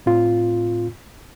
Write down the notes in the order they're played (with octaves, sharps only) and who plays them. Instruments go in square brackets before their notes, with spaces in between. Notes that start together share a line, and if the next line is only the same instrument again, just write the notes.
[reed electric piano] A2 C4 F4